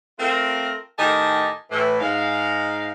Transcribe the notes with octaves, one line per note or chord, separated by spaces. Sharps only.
A3 C4 F4 A#4
A2 D#3 D#4 G4 G#5 A5
A2 E3
G#2 D#4 F5